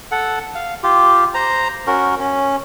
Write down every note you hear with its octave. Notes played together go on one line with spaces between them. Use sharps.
A4 F#5
F5
F4 G4
C5 A#5
C#4 F#4 A#4
C#4